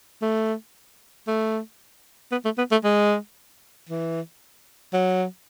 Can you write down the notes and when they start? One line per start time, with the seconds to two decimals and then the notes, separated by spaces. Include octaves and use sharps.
0.22 A3
1.28 A3
2.32 B3
2.45 A3
2.58 B3
2.71 A3
2.84 G#3
3.89 E3
4.93 F#3